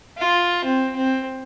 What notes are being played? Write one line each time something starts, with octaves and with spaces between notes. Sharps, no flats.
F4
C4
C4